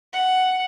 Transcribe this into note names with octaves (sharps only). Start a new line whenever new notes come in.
F#5